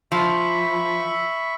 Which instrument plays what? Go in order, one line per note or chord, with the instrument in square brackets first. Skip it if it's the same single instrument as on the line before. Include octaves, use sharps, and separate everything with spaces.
[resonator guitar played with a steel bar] F3 [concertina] E5 B5 C#6